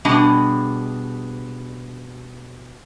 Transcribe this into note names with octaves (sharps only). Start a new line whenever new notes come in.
B2 G3 D4 G#4 D#5